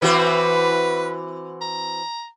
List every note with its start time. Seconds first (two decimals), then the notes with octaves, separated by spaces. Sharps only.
0.02 E3 C4 F#4 B4
1.61 A#5